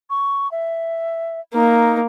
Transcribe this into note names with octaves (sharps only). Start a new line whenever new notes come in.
C#6
E5
A#3 D#4